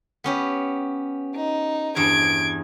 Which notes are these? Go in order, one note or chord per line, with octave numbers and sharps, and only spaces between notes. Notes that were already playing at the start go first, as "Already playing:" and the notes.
B3 C#4 G4
D#4
E2 G2 G#6 D7